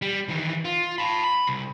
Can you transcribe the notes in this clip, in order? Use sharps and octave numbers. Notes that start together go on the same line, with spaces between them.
G3
D#3 E3
F4
A5 B5
B5
C2